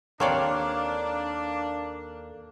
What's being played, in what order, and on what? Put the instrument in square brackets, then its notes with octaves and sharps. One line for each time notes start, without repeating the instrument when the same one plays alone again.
[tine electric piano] D#2 A4 F5 [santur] A#3 [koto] C4 C#5 D5 [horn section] D4